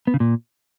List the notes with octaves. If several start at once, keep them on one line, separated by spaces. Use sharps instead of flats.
B3
C#3
A#2